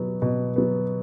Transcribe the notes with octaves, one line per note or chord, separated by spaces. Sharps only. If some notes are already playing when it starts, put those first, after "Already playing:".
Already playing: B2 F#3 B3
B2
F#3 B3